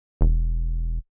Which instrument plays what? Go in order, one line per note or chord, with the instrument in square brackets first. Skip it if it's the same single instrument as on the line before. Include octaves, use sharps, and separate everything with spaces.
[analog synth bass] E1